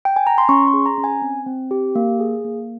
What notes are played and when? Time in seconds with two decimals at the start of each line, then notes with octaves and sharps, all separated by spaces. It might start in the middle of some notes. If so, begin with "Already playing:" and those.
0.05 G5
0.16 G#5
0.27 A#5
0.38 C6
0.49 C#4 C#6
0.67 C6
0.74 G#4
0.86 A#5
0.98 C#4
1.04 G#5
1.22 C4
1.46 C4
1.71 G4
1.95 A#3
2.20 G#4
2.44 A#3